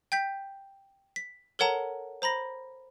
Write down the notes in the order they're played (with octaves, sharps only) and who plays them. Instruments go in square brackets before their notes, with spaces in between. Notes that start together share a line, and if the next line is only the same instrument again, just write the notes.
[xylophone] G5 G6 B6
B6
A4 A#4 C#5 F#5 A5 A#5
C5 A#5 B5 A#6